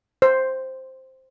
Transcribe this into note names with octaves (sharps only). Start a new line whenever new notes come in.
C5